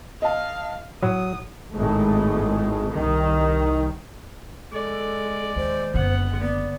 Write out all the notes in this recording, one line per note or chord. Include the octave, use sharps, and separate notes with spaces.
D#5 F5 A5
A2 F#3 F#5 D#6
G#1 A2 G#3 A3
C2 D#3
G#3 A4 D5
D#2 C5
F#1 D3 B3 F#5
B3 D5